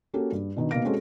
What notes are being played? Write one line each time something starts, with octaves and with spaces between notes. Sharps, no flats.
A#3 C#4 F#4 G4 A4 A#4
G2
B2 D#3 D4
B2 A#3 D#4 F5 A#6 D7
G#3 C4 C#4 F#4 G#4 A4